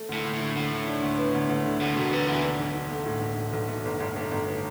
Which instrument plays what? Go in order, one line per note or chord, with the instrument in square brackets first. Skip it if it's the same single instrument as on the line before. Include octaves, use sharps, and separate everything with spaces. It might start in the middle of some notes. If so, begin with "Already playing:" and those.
Already playing: [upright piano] A3
[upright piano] D2 [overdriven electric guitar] A2
[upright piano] D2
[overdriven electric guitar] A2
[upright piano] D3
[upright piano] D2 [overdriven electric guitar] A2
[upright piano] D3
D4
D2
B3
D2
D2
D3
[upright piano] D2 [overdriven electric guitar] A2
[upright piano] E1 [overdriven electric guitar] B2
[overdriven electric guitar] D3 [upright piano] B3
[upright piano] D2 [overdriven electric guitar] E3
[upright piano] D4
B1
D4
A3
A2
A2
A3
B1
A3
G1
G1
A3
G1